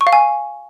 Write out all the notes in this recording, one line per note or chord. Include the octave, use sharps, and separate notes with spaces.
C#6
F5
G#5